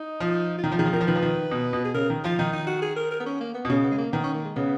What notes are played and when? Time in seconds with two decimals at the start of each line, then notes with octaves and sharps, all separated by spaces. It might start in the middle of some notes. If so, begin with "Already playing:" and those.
Already playing: D#4
0.20 F3
0.58 F4
0.64 D#3 D#4
0.72 F3
0.78 D#3 G#4
0.86 F3
0.93 D#3 A#4
1.01 F3
1.07 D#3 B4
1.15 F3
1.23 D#3
1.51 B2
1.73 B2
1.85 G#4
1.94 C#3 A#4
2.10 D#3
2.24 F3 F4
2.38 D#3 D#4
2.53 D#4
2.67 F#4
2.82 G#4
2.96 A#4
3.11 A#4
3.20 B3
3.26 C#4
3.41 A#3
3.54 B3
3.65 B2
3.68 C#3 C#4
3.84 B3
3.91 G#3
3.98 A#3
4.12 D#3 B3
4.23 C#4
4.34 A#3
4.45 G#3
4.56 C#3 B3